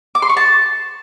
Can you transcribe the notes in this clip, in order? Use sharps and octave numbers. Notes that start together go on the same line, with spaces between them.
D6
C6
C#6
A5